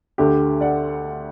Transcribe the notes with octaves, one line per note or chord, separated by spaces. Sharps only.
D2 D3 G4
D5 F#5